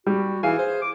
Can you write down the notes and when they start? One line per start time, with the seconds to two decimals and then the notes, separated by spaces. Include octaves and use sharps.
0.07 G3 F#4
0.43 E3 G#4 F5 G#5
0.59 C5
0.81 D6